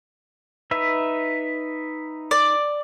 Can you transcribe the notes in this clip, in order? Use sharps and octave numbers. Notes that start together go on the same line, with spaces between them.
D#4 B4 E5
D5